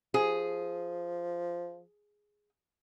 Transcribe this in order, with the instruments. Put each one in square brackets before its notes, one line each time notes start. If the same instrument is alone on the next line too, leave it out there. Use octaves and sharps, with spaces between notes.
[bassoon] F3 [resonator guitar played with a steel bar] G#4